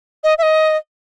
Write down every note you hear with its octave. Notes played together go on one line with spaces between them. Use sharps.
D#5
E5
D#5